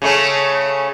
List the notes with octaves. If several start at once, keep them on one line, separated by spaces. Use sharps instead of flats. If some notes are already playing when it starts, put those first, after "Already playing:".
C#3 A3 C#4